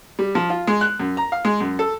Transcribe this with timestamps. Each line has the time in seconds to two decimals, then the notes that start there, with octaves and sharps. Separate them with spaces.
0.19 G3
0.35 F3
0.50 F4
0.67 G#3
0.81 F#6
1.00 F#2
1.17 A#5
1.32 F5
1.45 G#3
1.60 F#2
1.79 A4